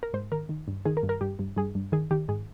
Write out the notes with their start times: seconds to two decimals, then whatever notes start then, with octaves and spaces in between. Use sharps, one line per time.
0.03 A#4
0.13 G#2 C5
0.32 D#3 A#4
0.49 D#3
0.68 G2
0.85 D#3 G#4
0.97 A#4
1.03 G2
1.09 A#4
1.21 G2 G4
1.39 G2
1.56 G2 G#4
1.75 G2
1.92 D#3 G#4
2.11 D#3 G4
2.28 G#2 G#4